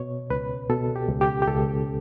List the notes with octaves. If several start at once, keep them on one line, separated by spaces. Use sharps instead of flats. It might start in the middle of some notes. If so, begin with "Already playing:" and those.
Already playing: B2 C#5
C#2 B4
B2 A4
G4
C#2
G4
G4
C#2 A4